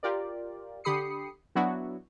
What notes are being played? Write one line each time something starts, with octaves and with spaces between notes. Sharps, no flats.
F4 G4 A#4 D5
D3 G4 B5 D#6 C7 C#7
F#3 B3 D4 E4 F#4